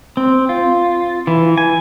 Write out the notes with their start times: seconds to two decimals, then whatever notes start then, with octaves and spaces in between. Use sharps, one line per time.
0.17 C4
0.49 F4
1.27 E3
1.58 G#5